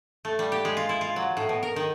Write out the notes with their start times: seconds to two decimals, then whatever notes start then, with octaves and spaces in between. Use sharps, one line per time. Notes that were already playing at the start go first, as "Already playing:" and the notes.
0.25 A3
0.39 G3
0.52 G4
0.65 G#3
0.77 F4
0.89 E4
1.01 F4
1.16 F#3
1.37 A2
1.49 B2
1.63 A#4
1.76 D#3